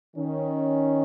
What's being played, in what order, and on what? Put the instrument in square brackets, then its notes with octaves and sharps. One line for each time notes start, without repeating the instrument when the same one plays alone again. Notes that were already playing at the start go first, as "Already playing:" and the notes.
[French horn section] D#3 C#4